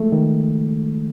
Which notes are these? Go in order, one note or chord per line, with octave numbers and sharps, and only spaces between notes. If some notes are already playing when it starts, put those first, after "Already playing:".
Already playing: F3 G#3 A3
D#3